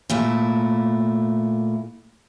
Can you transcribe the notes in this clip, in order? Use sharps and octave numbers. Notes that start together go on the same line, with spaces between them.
A#2 A3 E4